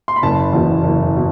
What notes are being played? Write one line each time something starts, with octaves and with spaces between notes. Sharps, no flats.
C6
B5
F#1 A5
E2 B2
F#1
B2